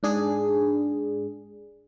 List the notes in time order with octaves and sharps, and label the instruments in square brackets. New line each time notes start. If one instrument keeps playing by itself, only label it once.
[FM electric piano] G#2 D4 G#4